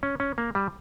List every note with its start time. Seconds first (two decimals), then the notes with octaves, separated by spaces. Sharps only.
0.03 C#4
0.20 C#4
0.38 A#3
0.55 G3